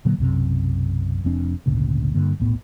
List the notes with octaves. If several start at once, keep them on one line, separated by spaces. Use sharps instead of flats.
A#2 D3 F#3 A#3
B1 F#2 C3
F1 F2 C4 D4
G#1 D2 A#2 C#3
G2 D3 A#3
D#1 B1 A2 B3